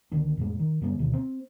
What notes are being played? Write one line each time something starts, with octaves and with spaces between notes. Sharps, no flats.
C#2 D3 D#3 D4
F2 A2 G#3
D#3
F#2 C#3 G3 B3
D2 B2 D#3
C4